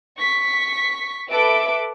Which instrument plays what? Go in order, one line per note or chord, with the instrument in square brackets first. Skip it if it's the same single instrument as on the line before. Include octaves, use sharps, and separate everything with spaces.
[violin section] C#6 B6
A4 B4 E5 D6 D7